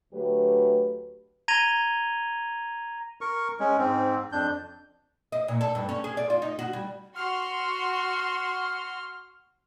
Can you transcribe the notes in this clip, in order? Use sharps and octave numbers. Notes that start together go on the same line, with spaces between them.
D2 F#3 A3 G4 B4
A#5 G#6 A#6 D#7 F7 G7
A#4 C#6
G#3 C#4
G#2 C4
F2 D4 G6
D#5
A#2
A4
G2
C#4
G#4
D5
F4
D#4
F#4
G3
F#4 C6 F6